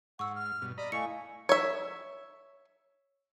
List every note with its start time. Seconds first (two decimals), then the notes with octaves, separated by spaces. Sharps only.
0.19 G#2 F#5 C#6 E6
0.35 F6
0.62 G2 B2
0.78 D5 D#5 A#5 B5
0.92 A3 E4 D#5 F5 G#5 C#6 C#7
1.49 C#5 E5